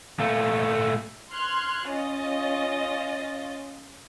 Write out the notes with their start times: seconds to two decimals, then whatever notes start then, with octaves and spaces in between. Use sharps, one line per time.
0.20 A#2 A3
1.32 C6 F6 F#6 G#6
1.89 C#4 F4 D#5 A6